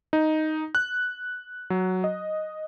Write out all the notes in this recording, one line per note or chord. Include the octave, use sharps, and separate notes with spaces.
D#4
F#6
F#3
D#5